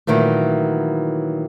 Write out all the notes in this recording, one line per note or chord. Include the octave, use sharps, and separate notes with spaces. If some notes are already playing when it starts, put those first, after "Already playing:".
A#2 D#3 E3 F#3 A3